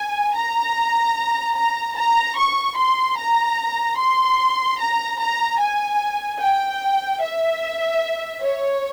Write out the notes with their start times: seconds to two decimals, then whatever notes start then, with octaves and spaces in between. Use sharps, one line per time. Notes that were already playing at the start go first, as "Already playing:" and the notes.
Already playing: G#5
0.35 A#5
1.56 A#5
1.96 A#5
2.37 C#6
2.77 C6
3.17 A#5
3.98 C6
4.80 A#5
5.20 A#5
5.60 G#5
6.40 G5
7.22 E5
8.42 C#5